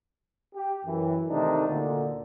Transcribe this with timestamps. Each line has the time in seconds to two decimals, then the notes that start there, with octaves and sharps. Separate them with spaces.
0.55 G4
0.86 F#2 E3
1.29 C3 D#3 A3 D4 D#4
1.67 D2 A#2 D3